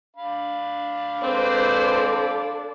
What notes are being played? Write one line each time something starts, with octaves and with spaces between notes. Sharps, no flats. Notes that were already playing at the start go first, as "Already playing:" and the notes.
D4 F5 B5
G#3 C4 A4 B4 C5 D5